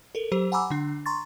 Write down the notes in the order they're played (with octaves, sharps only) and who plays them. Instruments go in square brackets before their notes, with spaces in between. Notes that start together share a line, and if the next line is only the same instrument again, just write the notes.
[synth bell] A4 A#4
F#3 G4 C5
F#5 G#5 A#5 B5 D6 E6
D3 D4
A#5 C6 C#6 A6